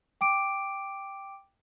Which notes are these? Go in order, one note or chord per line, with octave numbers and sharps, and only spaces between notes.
G5 D6 D7